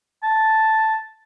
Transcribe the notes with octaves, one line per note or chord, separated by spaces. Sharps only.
A5